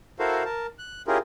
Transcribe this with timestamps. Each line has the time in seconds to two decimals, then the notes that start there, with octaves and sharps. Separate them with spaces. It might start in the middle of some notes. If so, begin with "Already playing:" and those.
0.19 E4 F#4 A4 A#4 C5 F5
0.45 A#4 A5
0.78 F#6
1.07 C#4 E4 F4 G4 G#4 A#4